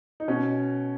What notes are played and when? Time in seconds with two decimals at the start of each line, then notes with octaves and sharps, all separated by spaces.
0.20 D#4
0.28 B2 C#4